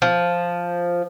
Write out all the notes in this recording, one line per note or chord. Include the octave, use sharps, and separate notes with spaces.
F3